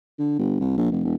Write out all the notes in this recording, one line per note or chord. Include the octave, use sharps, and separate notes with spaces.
D3
G1
C2
A#1
F1
E1